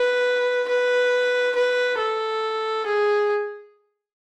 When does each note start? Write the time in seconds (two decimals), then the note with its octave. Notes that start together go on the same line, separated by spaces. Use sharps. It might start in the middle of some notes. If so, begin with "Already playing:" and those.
Already playing: B4
0.68 B4
1.55 B4
1.98 A4
2.86 G#4